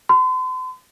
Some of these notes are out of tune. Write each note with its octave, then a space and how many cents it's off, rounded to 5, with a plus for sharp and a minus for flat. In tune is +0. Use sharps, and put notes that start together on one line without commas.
C6 -45